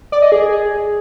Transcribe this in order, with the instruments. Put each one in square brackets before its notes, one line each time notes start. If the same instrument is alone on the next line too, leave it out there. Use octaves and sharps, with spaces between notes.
[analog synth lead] D5
D#5
G#4